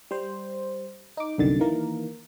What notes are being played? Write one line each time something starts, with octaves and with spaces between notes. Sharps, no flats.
G3 C5
D#4 D6
C2 F#2 D3 D#3 A6
D#3 E3 A#3 A#4